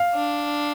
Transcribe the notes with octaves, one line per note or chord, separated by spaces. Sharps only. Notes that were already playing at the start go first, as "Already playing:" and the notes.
Already playing: F5
D4